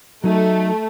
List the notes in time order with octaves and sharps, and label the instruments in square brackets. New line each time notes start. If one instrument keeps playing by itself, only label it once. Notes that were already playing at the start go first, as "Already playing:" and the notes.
[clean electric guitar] F#3 D#4 [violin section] A3